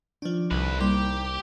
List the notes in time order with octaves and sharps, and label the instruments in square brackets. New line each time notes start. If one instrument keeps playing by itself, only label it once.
[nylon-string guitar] D#3 D5 [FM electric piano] F3 D4
[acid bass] C2 [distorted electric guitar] D3 B4
[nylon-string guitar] G3 A#3 D#4 [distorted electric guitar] G4 [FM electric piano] C6